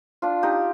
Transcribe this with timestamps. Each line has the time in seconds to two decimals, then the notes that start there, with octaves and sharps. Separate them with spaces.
0.22 D4 F4
0.43 D#4 G4